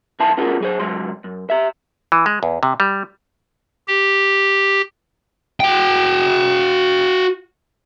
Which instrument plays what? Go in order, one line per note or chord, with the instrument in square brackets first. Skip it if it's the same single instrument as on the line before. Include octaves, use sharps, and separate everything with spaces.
[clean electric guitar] B1 D#3 E4 E5 A5 C6
B3 C#4 F4 F#4 G#4 A#4
F#3 G#4 C5
C#2 G#2 F#3 C6
F#2
G4 E5
[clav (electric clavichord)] E3
G#3
E2
C3
G3
[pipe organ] G4
[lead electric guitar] F#4 G5